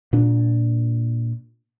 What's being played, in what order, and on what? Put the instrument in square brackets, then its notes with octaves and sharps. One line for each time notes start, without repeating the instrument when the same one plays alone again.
[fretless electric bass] A#2 D4